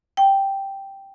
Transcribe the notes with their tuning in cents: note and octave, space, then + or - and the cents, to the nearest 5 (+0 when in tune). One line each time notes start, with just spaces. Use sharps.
G5 +0